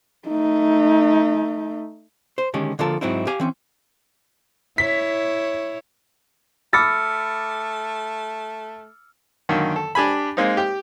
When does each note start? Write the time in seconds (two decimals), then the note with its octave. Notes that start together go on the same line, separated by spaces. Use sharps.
0.29 A3 D#4
2.38 C5
2.54 D3 D#3 G#3 C#4 G4
2.79 D3 F3 A#3 F4 A4 A#4
3.01 G#2 F#3 C4 D#4 E4
3.27 G4 F5 G#5
3.40 E3 C4 C#4
4.78 E4 C#5 B6
6.73 A3 B5 D6 E6 F6 A6 C#7
9.49 F#2 D3 D#3 A#3
9.76 A4
9.95 D4 G4 G#5 B5
10.37 G#3 A#3 C4 D#4
10.57 G4 G5